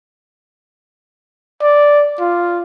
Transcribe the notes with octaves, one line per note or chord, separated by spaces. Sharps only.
D5
F4